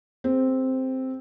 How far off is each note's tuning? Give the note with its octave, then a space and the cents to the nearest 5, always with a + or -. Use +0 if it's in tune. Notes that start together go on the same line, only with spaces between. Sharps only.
C4 +0 G#4 +0